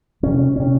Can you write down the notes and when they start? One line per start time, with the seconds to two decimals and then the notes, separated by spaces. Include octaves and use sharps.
0.23 F2 C3 C#4
0.56 C3 C#4